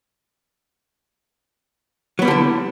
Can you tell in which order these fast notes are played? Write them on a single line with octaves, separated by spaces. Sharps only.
F#3 B3 G3 D3 E4